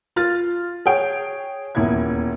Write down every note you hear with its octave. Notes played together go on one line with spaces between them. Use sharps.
F4 F6 A6
G#4 C#5 G5
D#1 E2 E4 G#6